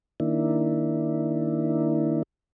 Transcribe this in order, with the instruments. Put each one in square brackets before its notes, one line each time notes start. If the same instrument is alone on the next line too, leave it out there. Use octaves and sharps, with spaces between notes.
[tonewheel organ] D#3 A#3 D4 E4